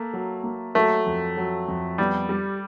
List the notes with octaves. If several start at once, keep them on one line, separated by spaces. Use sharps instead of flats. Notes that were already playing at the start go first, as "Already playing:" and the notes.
Already playing: A3 A#3
F#3
A#3
F#3 A3
F2
F#3
F2
G3 B3
G3